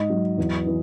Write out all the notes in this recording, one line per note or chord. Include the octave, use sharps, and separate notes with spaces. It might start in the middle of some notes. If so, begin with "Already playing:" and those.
Already playing: G#2 D#5
F#3
E2
E3